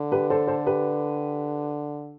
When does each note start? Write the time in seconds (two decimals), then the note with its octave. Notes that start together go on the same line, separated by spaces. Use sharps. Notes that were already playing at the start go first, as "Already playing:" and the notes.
Already playing: D3
0.12 G4 B4
0.30 A4 C5
0.47 A4 C5
0.66 G4 B4